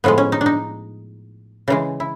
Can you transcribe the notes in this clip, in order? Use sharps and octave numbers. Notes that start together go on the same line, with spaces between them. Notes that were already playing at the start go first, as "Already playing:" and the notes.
A2 F3 G#3 B3
C#4
D#4
D4
D#4
C#3 E3 G#3
E4